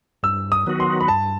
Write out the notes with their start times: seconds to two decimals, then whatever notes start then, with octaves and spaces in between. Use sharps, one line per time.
0.23 G2 E6
0.52 D#6
0.67 D#3 F#3 B3 F#4
0.80 C6
1.01 B5
1.08 G2 A5